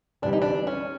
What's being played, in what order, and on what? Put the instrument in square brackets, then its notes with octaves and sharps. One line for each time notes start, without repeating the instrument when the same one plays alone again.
[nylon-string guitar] D2 C3 E3 G3 [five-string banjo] D4
[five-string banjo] D#4
D4
C#4